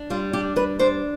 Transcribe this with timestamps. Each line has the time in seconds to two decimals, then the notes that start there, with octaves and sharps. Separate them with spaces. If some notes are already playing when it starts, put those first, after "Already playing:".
Already playing: D4
0.10 G3 F4
0.33 D4 G4
0.56 G3 B4
0.79 D4 C5